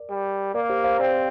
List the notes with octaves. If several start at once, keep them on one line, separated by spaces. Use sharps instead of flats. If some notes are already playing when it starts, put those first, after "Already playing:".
Already playing: A#4 D5
G3
A#3 A#4 D5
G4 C5
C5 F5
C4 D5 G5